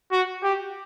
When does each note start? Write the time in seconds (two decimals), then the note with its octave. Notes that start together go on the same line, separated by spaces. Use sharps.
0.12 F#4
0.43 G4